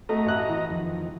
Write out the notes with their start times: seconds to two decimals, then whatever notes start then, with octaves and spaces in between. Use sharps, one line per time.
0.09 A3 F#4 D#5 A#5
0.26 A1 F#6
0.49 E3
0.70 F2 D#3